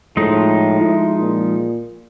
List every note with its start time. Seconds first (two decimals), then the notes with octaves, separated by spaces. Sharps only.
0.17 A2 F3 G#3 D#4
0.81 E4
1.19 A#2